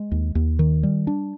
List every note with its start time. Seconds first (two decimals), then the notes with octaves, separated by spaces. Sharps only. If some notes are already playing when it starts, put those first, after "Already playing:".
Already playing: G#3
0.11 D#2
0.35 D#2
0.59 D#3
0.83 G3
1.07 D4